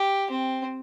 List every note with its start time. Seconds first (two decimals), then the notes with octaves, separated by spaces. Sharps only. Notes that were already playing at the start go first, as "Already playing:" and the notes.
Already playing: G4
0.30 C4